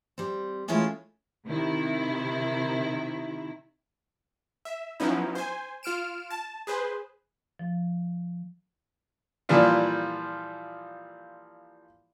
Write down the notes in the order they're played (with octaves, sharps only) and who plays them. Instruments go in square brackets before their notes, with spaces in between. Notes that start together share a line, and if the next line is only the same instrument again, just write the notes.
[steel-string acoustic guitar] G3 C4
E3 G#3 A3 C#4 E4 F4
[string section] C3 D#3 E4
[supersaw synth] E5
F3 F#3 B3 C#4 D#4 E4
C5 G#5
F4 F6 D7 E7
A5
G#4 B4 C5
[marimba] F3
[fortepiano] A#2 E3 F3 G3 F4